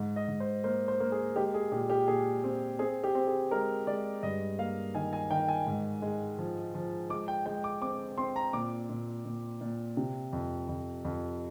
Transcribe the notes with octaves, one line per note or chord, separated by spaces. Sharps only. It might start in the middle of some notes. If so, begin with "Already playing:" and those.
Already playing: G#2
D#5
G#2
C5
A#3 C5
C5
A#3
G#4
G#3 G4
G#4
A#2 G4
G4
A#2 G#4
C4
C4 G#4
G4
C4
G#4
G#3 A#4
G#3 D5
G2 D#5
A#3 F5
D#3 G#5
G#5
D#3 G5
G#5
G#2
G#3
F3
F3
G#3 D6
G5
G#3 G5
D6
C4 D6
C4 C6
A#5
A#2 D6
A#2
A#2
A#2
C3
F2
F2
F2